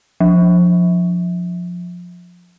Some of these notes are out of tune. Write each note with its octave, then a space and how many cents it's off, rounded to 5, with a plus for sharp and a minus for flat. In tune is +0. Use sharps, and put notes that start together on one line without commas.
F3 +20